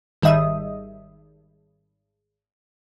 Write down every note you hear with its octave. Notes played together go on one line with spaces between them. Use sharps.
G#1 D#3 G3 D#5 E5 D#6